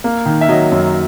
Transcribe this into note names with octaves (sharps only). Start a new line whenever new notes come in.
A#3
D#3
E5
F#3 D#5
F#2